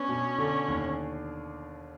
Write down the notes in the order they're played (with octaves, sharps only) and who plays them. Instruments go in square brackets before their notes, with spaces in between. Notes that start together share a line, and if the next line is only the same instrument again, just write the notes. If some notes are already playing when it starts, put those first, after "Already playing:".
Already playing: [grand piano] B3 D4 [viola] C#4
[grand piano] B2
D3
D#2